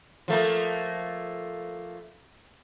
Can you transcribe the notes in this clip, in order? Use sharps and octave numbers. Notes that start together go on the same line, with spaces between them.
F3 A3 A#3